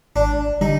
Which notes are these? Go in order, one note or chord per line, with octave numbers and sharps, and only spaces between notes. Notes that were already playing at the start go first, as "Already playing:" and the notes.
G#1 D4
D3 G3 D#4